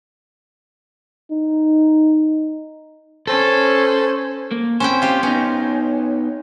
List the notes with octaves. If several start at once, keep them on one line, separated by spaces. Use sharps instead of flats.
D#4
C#4 A4 C5
A#3
C4 C#4 E4 C5 G5
F4 G4
B3 C#4 D#4